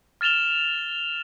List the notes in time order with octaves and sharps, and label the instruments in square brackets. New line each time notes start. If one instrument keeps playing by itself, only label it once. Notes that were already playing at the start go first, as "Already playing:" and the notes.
[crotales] F6 A6 E7 F7 G7